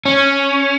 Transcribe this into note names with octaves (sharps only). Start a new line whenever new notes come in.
C#4